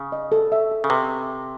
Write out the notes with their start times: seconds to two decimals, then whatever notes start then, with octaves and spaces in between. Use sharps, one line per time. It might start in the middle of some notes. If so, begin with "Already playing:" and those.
Already playing: C#3
0.12 D#5
0.32 A4
0.52 E5
0.71 A4
0.84 C#3
0.90 C3 B4